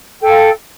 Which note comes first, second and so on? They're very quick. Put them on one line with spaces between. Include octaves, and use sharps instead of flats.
G5 A4 F5